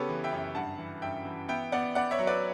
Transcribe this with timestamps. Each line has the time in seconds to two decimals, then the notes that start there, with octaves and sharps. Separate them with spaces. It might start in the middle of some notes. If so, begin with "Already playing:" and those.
Already playing: C#3 B3 G4 A4 B4 C#5
0.09 E3
0.24 E5 G5
0.32 F#2
0.55 G2 F#5 A5
0.78 E3
1.02 G2 E5 G5
1.25 E3
1.48 B3 E5 G5
1.72 B3 D5 F#5
1.95 B3 D5 F#5
2.11 C#5 E5
2.19 F#3
2.27 B4 D5